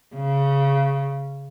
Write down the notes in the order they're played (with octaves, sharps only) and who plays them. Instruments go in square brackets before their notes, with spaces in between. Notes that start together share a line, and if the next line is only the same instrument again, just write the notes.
[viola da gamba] C#3